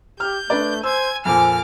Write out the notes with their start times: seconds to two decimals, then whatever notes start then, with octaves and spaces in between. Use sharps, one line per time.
0.20 G4 F6 G6
0.50 A3 D4 B4 D5
0.83 C5 G#5 E6 G#6
1.25 F2 A#2 C5 G#5 D6 F6